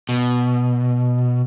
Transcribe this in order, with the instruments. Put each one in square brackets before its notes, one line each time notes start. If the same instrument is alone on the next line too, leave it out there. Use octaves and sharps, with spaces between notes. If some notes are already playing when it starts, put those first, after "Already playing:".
[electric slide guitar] B2